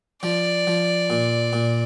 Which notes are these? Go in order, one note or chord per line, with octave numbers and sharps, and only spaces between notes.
F3 D5
F3
A#2
A#2